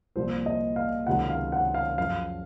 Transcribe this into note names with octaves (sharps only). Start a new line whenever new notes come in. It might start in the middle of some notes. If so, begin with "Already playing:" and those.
C2 A#2 F3 C5
D#5
F5
C#2 C3 D#3 F#3 F#5
F5
F#5
F5
F#2 F3 F5